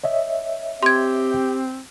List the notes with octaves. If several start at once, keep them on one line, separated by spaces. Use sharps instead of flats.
C#5 D#5 E5
C4 G4 C6 G#6